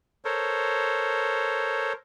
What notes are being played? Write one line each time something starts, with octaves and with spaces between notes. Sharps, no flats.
A4 A#4 C5 C#5